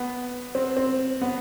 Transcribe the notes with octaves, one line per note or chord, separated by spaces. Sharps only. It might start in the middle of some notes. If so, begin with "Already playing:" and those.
Already playing: B3
C4
C4
B3